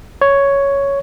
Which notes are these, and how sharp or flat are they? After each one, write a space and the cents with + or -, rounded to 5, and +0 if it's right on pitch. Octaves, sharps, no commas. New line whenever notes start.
C#5 +5